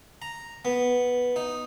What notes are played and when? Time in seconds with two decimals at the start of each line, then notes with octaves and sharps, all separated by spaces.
0.22 A#5
0.65 B3
1.36 D#4